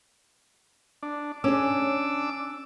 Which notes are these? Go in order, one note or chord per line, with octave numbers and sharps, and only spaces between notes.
D4
C#4 D4 G#4 D6 E6